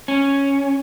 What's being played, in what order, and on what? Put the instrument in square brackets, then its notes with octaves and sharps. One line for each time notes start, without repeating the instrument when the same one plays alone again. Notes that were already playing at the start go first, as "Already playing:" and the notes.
[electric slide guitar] C#4